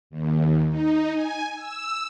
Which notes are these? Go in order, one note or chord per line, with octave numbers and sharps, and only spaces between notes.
D#2
D#4
G#5
E6